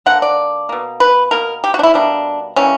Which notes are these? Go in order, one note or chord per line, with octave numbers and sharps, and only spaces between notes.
D3 A#3 F#5
D5
B2 A#3
B4
B2 A#3 A#4
G4
F#4
D4
E4
B2 G3 A#3 D4
E3 G3 A#3 C#4